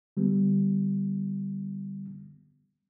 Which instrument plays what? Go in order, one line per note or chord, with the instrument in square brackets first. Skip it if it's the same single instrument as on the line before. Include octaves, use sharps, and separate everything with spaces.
[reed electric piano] D3 G3 B3